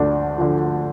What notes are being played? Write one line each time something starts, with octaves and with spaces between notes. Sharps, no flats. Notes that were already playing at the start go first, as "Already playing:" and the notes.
Already playing: D2 D3 F3 D4
D3 F3